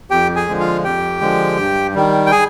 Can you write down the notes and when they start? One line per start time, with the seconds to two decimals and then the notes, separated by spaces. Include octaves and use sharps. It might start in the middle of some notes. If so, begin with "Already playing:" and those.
0.11 F2 G4 G5
0.36 G#4 G#5
0.48 D3 F3 G#3
0.60 F4 F5
0.84 F2 G4 G5
1.21 D3 F3 G#3
1.58 G2
1.94 D#3 G3
2.26 G5
2.31 G#4 G#5